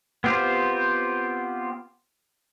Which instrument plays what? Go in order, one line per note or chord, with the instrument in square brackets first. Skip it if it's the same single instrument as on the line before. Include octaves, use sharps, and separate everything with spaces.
[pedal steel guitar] B3 C4 F4 G4 C5